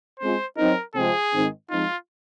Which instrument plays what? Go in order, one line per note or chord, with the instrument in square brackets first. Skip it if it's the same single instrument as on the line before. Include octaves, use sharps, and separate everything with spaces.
[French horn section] G#3 C4 F4 [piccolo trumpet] C5
[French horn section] F#3 C4 D#4 [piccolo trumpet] A#4
[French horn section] C3 F3 G#3 C4 [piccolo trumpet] G#4
[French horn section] G#2 D#3 G#3 C4 D#4
[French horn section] F3 G#3 C4 D#4 [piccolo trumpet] F4